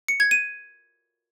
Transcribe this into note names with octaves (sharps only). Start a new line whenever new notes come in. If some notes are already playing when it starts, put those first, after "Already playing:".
C#7
G#6
D#7